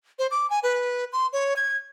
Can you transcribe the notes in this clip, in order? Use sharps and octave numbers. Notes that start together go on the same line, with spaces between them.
C5
D6
G#5
B4
C6
C#5
G#6